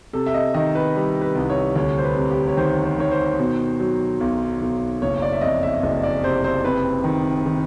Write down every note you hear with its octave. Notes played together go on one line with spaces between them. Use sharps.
C3 A4
E5
D#5
D#3 D#5
B4
G3
B4
C2
C#5
D2 C#5
C5
B4
C3
G4
C#5
D#3 C5
C5
D#3 C#5
C5
B2
F#3
B1
B1
F#1 C#5
D5
E5
F2 D#5
E5
F#1 D#5
D5
C3 C5
C5
C4 B4
D#3
D#3